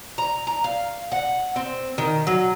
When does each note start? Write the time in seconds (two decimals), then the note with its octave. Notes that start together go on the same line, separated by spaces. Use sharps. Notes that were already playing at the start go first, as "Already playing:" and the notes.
0.18 A#5
0.47 A#5
0.64 F5
1.12 F#5
1.56 C4
1.98 D#3
2.27 F#3